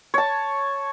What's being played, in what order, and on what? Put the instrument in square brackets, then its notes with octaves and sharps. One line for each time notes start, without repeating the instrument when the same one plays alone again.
[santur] C#5 A5